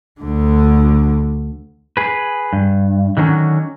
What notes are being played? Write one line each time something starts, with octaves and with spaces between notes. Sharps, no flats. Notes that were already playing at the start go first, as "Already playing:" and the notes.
D2 D3
G#4 B4
G2
D3 D#3 F#3 C4 C#4